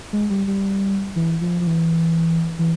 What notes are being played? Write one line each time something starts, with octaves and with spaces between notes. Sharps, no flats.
G#3
G3
G3
E3
F3
F3
E3
E3